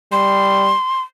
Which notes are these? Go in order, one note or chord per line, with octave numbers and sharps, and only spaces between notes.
G3 C6